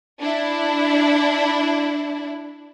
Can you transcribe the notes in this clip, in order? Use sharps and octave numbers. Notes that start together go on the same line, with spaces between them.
D4 E4